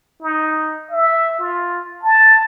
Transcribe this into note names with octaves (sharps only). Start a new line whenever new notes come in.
D#4
E5
F4
A5